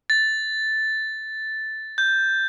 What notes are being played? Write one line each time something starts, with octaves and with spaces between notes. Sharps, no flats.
A6
G6